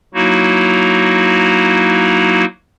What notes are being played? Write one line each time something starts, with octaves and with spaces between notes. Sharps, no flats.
F#3 A#3 D#4 E4 F#4